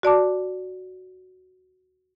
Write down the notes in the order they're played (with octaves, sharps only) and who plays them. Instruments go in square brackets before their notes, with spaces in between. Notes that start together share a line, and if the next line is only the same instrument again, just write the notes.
[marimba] F#4 D5 A5 D6